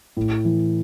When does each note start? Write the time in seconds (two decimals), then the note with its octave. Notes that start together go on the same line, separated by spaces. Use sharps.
0.17 A2
0.45 E3